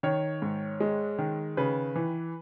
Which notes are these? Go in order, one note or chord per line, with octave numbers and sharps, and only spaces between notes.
D#3 C#5
G#2
G#3
D#3
C#3 B4
E3